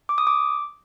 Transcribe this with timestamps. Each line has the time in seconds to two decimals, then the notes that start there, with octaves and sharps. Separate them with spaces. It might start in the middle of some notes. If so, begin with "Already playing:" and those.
0.09 D6
0.18 D#6
0.27 D6